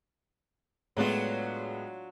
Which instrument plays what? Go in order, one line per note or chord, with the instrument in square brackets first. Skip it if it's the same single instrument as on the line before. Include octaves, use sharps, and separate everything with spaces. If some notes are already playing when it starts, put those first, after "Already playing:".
[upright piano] A2 G#3 B3 [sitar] F#3 D4 F4